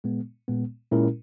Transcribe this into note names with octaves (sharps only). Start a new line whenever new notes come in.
A#2 G#3 B3
A#2 G#3 B3
A#2 G#3 C#4 E4 A#4